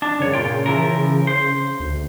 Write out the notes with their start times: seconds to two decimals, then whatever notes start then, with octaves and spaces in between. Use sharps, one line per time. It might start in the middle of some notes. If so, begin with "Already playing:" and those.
0.02 D4
0.20 C2 F#2 C#3 C#5
0.34 A#2 C#3 F4 G5
0.66 E3 F3 A#4
1.27 C5
1.80 D2